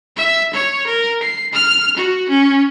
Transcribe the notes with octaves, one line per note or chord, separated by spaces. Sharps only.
E5
C#5
A#4
C7
F6
F#4
C#4